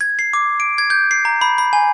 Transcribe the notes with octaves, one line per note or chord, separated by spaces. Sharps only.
G#6
C7
D6
D7
G#6
G6
C7
A#5
B5
B5
G#5